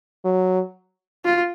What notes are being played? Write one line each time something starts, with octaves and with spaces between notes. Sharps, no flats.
F#3
F4